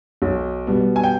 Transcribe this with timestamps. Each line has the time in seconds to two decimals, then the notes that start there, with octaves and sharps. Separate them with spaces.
0.22 B1
0.67 B2 G3 B3
0.96 G#5
1.04 G5